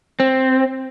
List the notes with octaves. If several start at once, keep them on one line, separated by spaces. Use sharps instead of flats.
C4